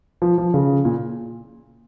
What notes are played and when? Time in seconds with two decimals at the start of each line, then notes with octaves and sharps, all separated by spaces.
0.22 F3
0.38 F3
0.54 C#3
0.85 A#2